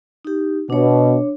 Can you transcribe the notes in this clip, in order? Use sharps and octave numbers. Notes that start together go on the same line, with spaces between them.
D#4 G4
B2 D4 C#5